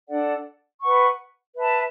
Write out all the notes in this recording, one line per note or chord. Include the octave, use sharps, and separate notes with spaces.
D4 A4 D5 F#5
B4 F#5 C#6
B4 E5 A5